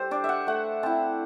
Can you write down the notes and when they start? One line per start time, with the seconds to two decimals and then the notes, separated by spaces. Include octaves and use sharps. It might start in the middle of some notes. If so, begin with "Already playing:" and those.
Already playing: G3 G4 A4 C5
0.11 D4 D5
0.24 E5
0.29 F#5
0.47 A3 F#5
0.83 C4 E4 A5